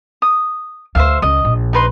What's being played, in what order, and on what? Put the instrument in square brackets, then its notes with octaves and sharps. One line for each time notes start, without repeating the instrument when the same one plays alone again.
[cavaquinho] D#6
[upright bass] D2 [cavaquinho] C5 E5 F5
[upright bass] C#2 [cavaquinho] D#5
[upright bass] A#1
[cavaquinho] D#4 B4 C6